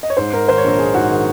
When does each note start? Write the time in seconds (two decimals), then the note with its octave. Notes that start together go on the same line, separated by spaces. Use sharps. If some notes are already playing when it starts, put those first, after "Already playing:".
0.03 D#5
0.10 C#5
0.17 G#2 C5
0.33 G#2 A#4
0.48 D#3 C5
0.58 C#5
0.64 A#1 A#4
0.78 A#1 G#4
0.94 G#2 F#4
1.10 D#3 G#4